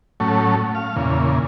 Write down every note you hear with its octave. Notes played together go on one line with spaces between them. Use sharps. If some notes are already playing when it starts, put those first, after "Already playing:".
A2 F#3 A3 C#4
F5
E2 A#2 C#3